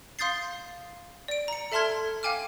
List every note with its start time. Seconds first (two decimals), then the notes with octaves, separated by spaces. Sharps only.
0.19 F5 C6 D#6 G6 A6 C7
1.28 D5 D7
1.48 A#5 C#7
1.72 A4 E5 A5 C6 F6 G#6
2.23 F5 G5 G#5 D6 F6